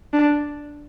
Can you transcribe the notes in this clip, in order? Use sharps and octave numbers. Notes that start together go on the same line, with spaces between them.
D4